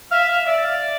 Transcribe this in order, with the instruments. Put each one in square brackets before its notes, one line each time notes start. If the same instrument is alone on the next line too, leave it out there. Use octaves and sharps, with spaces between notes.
[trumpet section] E5 [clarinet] F5
[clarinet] F5
[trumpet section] D5 [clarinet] E5
[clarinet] F5
E5